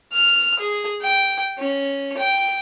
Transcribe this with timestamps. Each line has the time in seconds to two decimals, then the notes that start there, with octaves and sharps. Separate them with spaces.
0.12 F6
0.59 G#4
1.01 G5
1.58 C#4
2.17 G5